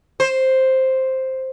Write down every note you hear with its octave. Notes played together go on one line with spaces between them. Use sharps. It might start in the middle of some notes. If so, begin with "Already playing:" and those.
C5